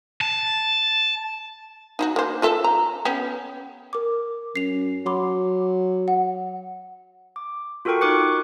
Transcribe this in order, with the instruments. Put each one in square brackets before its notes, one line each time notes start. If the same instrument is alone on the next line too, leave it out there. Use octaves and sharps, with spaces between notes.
[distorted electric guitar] A5
[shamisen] D#4 E4 F#4
A#3 C5
F4 A4 E5
A#5
B3 C#4 G4
[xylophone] A#4 D6
[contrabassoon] F#2 [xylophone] C7 F7
[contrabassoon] F#3 [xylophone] B5 C6 D6
[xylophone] F#5
[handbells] D6
F4 F#4 A4 A#4 G5 C#6
D#4 A#4 C#6 D6 F#6 C#7